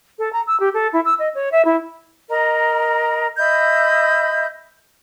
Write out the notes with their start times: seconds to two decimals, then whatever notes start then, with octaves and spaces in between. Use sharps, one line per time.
0.19 A4
0.33 A#5
0.47 E6
0.60 G4
0.74 A4
0.93 E4
1.05 E6
1.19 D#5
1.35 C#5
1.52 E5
1.65 E4
2.30 A#4 D#5 A#5
3.38 D#5 E5 B5 G6